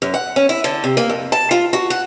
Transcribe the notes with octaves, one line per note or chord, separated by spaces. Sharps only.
F#2
F#5
C#4
E4
D3
C3
A#3
F2
A5
F4
F#4
F#5